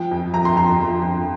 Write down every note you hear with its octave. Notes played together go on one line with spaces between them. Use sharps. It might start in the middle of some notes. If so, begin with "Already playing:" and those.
Already playing: F3 G5
F2
F2 A#5
C6
F2 A#5
F3
F2